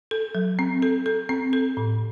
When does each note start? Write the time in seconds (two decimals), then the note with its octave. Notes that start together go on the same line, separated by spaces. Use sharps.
0.11 A4
0.35 F#3
0.59 C4
0.82 A4
1.06 A4
1.29 C4
1.53 A4
1.77 A2